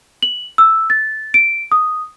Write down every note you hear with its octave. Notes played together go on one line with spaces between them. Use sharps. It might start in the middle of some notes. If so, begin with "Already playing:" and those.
F#7
E6
A6
D7
D#6